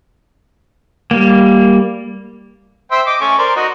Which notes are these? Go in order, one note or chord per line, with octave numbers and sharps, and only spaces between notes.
G3 A#3
C5 E5 G5
D#5 D6
A3 C#4 C#6
A#4 C5 D5
D#4 F#4 D#5